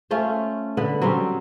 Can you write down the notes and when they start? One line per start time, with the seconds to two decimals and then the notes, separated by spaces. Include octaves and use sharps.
0.11 A3 C#4 F4 C5
0.77 D3 B3 B4
1.02 F#3 G3 C4 C#4